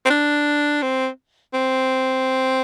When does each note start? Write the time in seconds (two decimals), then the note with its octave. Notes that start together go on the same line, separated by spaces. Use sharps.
0.06 C4
0.10 D4
0.82 C4
1.54 C4